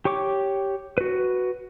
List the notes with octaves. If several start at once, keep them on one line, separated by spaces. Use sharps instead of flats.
G4 C#5 C#6 D6
F#4 B4